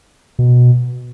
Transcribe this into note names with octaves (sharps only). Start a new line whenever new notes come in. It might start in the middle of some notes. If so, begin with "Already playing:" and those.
B2